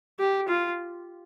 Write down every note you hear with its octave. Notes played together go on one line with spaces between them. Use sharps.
G4
F4